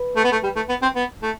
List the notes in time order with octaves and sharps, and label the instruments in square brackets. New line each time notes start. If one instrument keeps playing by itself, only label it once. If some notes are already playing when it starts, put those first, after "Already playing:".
Already playing: [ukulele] B4
[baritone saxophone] A3
B3
A3
G3
A3
B3
C4
B3
A3